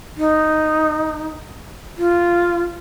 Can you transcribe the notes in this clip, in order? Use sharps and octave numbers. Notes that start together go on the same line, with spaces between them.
D#4
F4